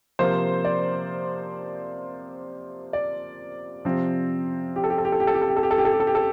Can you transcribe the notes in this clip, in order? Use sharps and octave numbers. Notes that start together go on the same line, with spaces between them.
C3 F3 A#3 C5
D5
D5
C3 F3 C4
G4
A4
G4
A4
G4
A4
G4
A4
G4
A4
G4
A4
G4
A4
G4
A4
G4
A4
G4
A4